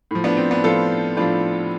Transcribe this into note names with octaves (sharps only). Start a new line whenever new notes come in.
A2 F3
B3 D4
C4
B3 D4
A2 F3 F4 A4
A2 F3 D4 F4